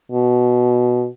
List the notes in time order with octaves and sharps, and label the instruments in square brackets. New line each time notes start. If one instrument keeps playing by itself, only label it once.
[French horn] B2